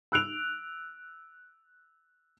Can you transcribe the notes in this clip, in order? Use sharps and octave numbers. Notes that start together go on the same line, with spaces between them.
E6 F#6 D7 F7